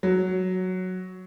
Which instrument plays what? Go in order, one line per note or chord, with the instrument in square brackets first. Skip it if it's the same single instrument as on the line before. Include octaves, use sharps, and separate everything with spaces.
[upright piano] F#3